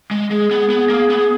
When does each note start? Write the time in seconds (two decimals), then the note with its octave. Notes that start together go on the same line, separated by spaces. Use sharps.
0.11 G#3
0.30 G#3 G#4
0.51 B3
0.70 B3
0.89 A#3
1.10 B3